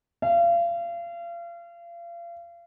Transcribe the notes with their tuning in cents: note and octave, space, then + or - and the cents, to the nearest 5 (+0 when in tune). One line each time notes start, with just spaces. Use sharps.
F5 -35